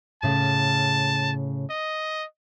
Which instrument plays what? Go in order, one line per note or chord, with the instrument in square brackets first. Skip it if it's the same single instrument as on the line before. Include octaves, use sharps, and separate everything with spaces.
[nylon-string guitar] A2 C#3 [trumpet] A5
[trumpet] D#5